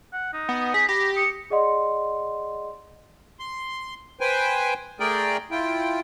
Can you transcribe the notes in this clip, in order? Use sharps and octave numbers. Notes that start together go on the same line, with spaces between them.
F#5
D#4
B3
G#4 B6
G4 B5 A#6
D#6 C#7
G#4 D5 D#5 F#5 C6
C6
B4 C5 G5 G#5
A3 G#4 A#4 D5 G5
E4 F4 G5